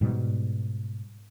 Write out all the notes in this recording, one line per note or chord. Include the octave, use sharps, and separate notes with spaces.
G#2 B2 G3